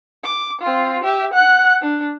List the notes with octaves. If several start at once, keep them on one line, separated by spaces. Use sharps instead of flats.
D6
C4 F4
G4 E5
F#5 F#6
D4